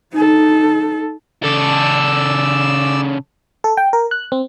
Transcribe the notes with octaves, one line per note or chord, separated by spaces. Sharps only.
D#4 A4
C#3 A4 D5 E6
A4
G5
A#4
F#6
C4